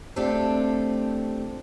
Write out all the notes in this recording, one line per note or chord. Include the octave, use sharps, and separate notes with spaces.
A3 C4 D4 F4 G4 A4